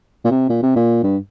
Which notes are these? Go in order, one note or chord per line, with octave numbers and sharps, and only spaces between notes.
A#2
C3
A#2
C3
A#2
G2